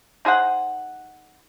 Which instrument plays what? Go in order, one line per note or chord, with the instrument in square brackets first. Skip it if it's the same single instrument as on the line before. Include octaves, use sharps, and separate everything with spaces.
[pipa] D#4 G#4 C5 F#5